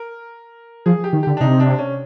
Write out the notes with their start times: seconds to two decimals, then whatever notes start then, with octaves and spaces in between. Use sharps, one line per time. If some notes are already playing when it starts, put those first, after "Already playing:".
Already playing: A#4
0.86 F3 G#4
1.04 G4
1.13 D#3
1.23 D3 G4
1.37 D4
1.40 C3 D#4
1.60 D4
1.79 C#4